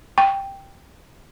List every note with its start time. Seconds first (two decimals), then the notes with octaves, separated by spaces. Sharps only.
0.18 G5